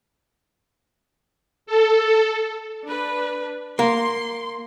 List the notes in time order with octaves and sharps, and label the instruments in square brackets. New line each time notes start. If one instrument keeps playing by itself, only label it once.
[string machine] A4
[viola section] D4 B4
[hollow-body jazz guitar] A#3 [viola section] C6